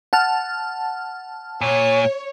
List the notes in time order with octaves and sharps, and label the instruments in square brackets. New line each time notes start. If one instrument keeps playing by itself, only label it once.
[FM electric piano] F#5 A5 F6
[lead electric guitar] A#2 [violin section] C#5